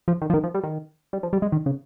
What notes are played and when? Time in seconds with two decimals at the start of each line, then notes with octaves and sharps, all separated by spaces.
0.08 F3
0.22 D#3
0.30 F3
0.34 D#3
0.44 F3
0.54 G3
0.63 D#3
1.13 G3
1.23 F3
1.33 G3
1.42 G#3
1.52 D#3
1.66 C#3